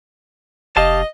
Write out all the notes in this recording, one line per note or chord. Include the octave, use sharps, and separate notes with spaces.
F1 G4 D#5 F5 A5